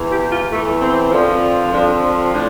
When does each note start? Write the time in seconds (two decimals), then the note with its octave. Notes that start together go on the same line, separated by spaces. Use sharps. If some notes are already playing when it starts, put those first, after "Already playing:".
Already playing: E2 E3
0.11 G4
0.31 F4
0.51 E2 E3 A3
0.81 C4
1.12 F2 D3 F3
1.73 F2 D3 F3 D4
2.34 A2 D4